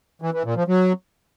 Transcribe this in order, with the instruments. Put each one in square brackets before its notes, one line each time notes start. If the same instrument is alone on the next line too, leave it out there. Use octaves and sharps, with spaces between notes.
[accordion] E3
E3
A#2
F3
F#3